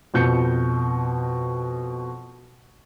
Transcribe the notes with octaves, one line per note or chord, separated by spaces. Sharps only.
F2 B2 G6 C#7